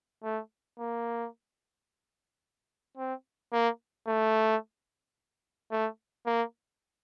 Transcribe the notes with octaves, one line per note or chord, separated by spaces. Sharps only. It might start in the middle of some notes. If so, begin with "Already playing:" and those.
A3
A#3
C4
A#3
A3
A3
A#3